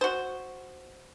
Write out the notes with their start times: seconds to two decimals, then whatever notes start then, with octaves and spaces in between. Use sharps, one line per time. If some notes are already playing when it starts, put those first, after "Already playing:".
0.01 F#4 C5